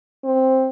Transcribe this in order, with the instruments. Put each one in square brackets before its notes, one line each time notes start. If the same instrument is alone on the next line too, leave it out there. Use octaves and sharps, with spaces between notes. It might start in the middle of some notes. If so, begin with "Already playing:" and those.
[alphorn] C4